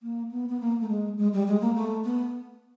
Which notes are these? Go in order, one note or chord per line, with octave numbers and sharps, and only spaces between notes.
A#3
B3
B3
A#3
A3
G#3
G#3
G3
G#3
A#3
A3
B3